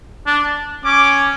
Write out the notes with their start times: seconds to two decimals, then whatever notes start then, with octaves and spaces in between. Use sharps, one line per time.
0.27 D4
0.84 C#4 D6